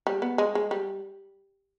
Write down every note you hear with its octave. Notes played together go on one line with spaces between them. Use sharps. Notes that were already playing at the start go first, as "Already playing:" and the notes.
G3
B3
G#3
G#3
G3